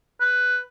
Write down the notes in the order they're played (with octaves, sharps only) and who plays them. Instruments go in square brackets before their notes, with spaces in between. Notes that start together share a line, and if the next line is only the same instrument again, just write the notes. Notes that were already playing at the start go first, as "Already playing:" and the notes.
[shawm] B4